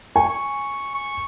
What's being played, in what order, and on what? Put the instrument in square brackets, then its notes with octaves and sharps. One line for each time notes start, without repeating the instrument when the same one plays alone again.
[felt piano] G#5 [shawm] C#6
[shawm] C#6
C#6